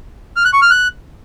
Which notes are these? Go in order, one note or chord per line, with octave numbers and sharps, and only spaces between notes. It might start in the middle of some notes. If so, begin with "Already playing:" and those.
F6
F#6
C#6
F6
F#6